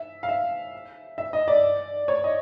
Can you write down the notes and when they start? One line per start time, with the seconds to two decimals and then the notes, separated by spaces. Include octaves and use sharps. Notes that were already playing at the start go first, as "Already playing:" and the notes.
Already playing: E5
0.23 F5
0.29 E5
1.18 E5
1.33 D#5
1.48 D5
2.08 C#5
2.24 D#5